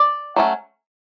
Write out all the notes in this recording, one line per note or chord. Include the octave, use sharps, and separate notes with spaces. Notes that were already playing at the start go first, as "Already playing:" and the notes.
Already playing: D5
F#3 A3 C#4